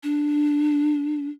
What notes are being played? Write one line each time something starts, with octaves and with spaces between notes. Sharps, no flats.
D4